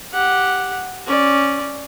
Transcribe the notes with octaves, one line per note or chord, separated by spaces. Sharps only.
G4 F#5
C#4 D5